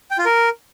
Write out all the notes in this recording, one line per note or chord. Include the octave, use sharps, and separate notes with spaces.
G5
F4
A#4